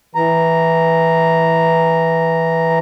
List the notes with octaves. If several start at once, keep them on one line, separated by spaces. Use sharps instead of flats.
E3 A#5